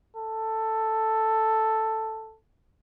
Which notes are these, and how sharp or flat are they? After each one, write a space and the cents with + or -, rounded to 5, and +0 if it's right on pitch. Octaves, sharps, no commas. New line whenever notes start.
A4 +5